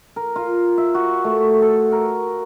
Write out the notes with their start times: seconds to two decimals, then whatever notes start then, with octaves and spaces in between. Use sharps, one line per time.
0.16 A#4
0.36 F4
0.78 E5
0.94 F#4
1.24 A3
1.62 A4
1.92 A#4